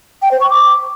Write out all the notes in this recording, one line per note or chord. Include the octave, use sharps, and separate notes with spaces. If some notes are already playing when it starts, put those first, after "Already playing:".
G5
C5
C#6
D6